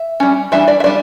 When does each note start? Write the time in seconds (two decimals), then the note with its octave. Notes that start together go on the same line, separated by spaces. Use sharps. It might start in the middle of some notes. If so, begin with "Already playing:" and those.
Already playing: E5
0.20 G3 C#4
0.52 E3 G3 D4 E5
0.68 D5
0.80 E5
0.84 G3 D4 D5